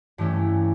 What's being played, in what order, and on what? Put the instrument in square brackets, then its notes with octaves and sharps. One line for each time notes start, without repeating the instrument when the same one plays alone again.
[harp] G2 E3 A3 C#4 G4